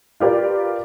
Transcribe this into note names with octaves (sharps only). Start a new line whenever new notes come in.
F4 G4 A#4 B4 D5